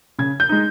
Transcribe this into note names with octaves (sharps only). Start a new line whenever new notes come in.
C#3 G#6
G6
G#3 D#4